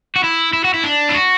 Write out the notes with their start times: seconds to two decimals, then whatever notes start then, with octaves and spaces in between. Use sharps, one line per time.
0.16 F#4
0.23 E4
0.53 E4
0.64 F#4
0.74 E4
0.84 D4
1.09 E4
1.14 F#4